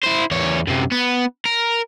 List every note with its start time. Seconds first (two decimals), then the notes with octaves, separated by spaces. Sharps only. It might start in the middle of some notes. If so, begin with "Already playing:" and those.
0.03 E4 C5
0.31 E2 C#5
0.67 F#2 C3
0.92 B3
1.45 A#4